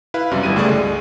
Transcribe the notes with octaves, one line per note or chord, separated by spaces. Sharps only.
E4 B4 F5
F#2 C3 G3
G1 G3 E4 D#7
C#2 A3 G#4 D5
G#3